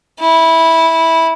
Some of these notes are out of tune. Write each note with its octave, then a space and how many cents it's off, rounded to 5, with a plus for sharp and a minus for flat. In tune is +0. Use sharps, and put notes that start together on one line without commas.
E4 -10